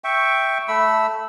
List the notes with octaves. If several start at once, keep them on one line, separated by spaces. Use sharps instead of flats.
E5 G5 C#6
A3 B5 E6